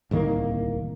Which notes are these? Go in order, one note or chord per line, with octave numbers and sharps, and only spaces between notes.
D1 C2 D#3 A#3